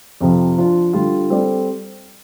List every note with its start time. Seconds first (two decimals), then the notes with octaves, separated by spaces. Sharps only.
0.21 F2 C3 F3
0.57 F3 D4 F4
0.93 D3 G3 F4
1.30 G3 C4 A4 D5